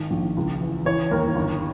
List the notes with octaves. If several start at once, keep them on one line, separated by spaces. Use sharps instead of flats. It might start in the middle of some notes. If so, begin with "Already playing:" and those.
Already playing: G#1 D#3
A#1
C#2
E3
E3 C#5
D#2 A#4
G1